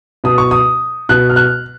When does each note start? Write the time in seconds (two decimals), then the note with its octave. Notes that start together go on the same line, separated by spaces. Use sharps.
0.24 B2 D#6
0.38 C#6
0.51 D#6
1.09 B2 F#6
1.30 F6
1.36 F#6